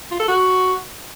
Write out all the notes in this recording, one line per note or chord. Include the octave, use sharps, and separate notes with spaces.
F4
A4
F#4